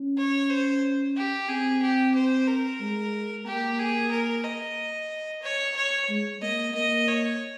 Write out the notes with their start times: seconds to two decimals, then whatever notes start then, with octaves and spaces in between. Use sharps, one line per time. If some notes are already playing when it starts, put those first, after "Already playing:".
Already playing: C#4
0.18 C#5
0.50 C5
1.16 G4
1.49 C4 G#4
1.82 G4
2.15 C5
2.47 A#4
2.80 G#3
3.46 A#3 G4
3.79 G#4
4.11 A#4
4.44 D#5
5.43 C#5
5.76 C#5
6.09 G#3
6.42 A#3 D#5
6.75 A#3 D#5
7.08 C#5